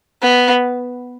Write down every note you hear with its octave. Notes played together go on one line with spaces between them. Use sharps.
B3